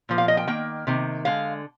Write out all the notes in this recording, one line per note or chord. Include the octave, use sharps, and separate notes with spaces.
A#2 F3 A#3
F5
D#5
G5
D#3 A#3 G5
C3 D#3 A#3
D3 G#3 F5